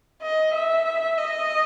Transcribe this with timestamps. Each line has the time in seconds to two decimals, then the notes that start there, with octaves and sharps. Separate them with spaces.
0.22 D#5
0.54 E5
1.18 D#5